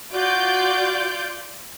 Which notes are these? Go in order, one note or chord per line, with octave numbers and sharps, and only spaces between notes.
F4 F#4 D5 G6